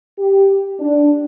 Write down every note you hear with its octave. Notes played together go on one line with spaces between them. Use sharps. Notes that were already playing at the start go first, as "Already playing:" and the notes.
G4
D4